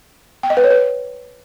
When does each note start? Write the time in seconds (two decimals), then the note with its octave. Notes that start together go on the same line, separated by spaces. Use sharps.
0.43 G5
0.50 D#5
0.57 B4
0.64 C#5
0.70 B4